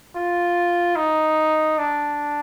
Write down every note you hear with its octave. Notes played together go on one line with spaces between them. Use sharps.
F4
D#4
D4